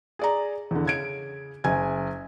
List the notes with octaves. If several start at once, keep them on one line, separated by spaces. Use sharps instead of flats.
G#4 D5 A#5
E2 D3
C#3 G#6 D7
F#1 G#5 G#6